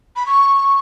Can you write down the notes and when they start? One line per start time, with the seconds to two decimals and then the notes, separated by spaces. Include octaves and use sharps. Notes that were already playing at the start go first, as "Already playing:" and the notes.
0.16 B5
0.26 C#6